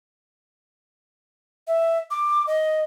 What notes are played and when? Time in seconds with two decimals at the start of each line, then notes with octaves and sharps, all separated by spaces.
1.67 E5
2.11 D6
2.47 D#5